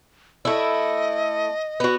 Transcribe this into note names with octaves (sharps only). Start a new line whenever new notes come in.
A3 E4 D#5
B3 F#4